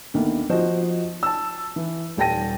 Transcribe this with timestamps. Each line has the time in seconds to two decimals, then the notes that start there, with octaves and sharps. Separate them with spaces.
0.14 D2 D#3 A#3 B3
0.50 F3 F#4 C5 D#5
1.23 A5 E6
1.76 E3
2.17 D#1 G3 G5 A5 A#6 D#7